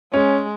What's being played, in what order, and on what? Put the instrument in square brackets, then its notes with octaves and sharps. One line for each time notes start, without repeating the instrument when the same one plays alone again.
[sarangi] G#3 [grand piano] C#4